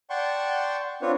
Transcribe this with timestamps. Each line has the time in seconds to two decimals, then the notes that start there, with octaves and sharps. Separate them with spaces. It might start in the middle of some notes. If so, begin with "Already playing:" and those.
0.10 D5 F#5 G5 A5 C6 C#6
1.02 C4 D4 F4 B4 C#5